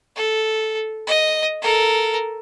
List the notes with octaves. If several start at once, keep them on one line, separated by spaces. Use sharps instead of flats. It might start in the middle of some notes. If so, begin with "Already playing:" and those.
A4
D#5
A4 A#4